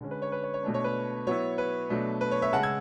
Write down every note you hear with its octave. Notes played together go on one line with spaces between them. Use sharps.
D3 G#3 C#4
B4
C#5
B4
C#5
C#5
B2 A3 D4
C#5
B4
F#3 B3 E4 C#5
B4
B2 F#3 A3 D4
B4
C#5
C#5 E5
C#3 G#3 C#4 F#5 A5
E6 G#6